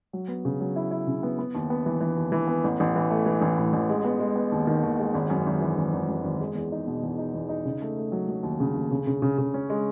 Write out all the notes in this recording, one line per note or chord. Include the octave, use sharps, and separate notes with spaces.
F#3
B3
C#3
F#3
E4
E4
C#3
B3
B3
D#2
B3
E3
E3
D#2
E3
B3
A1
A1
E3
A3
E3
A1
A2
A1
G#3
B3
G#3
B3
D#2
D#3
D#2
G#3
G#1
F#2
G#1
E3
G#1
G#1
F#2
G#1
G#3
E2
D#4
B2
E2
D#4
E2
D#4
C#3
A3
A3
F#3
F#3
D#2
C#3
D#2
C#3
C#3
C#3
C#3
C#4
G#3